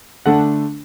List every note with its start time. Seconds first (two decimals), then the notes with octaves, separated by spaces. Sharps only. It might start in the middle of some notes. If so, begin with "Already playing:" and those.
0.26 D3 A3 D4 F#5 A5